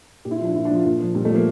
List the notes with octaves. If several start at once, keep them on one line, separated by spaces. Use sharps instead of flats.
A#2 G4
E4
F4
F3 D4
A#2 E4
D4
F3 F4
A#2
F3
A#2 G3
A3
F3 A#3